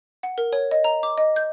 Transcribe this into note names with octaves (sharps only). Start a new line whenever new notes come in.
F#5
A#4
C#5
D#5
A#5
D6
D#5
G6